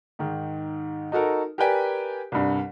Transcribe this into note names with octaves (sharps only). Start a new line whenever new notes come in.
G#2 D#3
D#4 F#4 A4 A#4
G4 A#4 B4 D5 G5 G#5
C2 G2